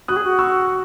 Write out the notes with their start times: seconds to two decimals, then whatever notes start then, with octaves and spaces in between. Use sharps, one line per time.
0.08 F#4 D#6 F#6
0.16 G#4
0.24 F#4
0.39 C#6 E6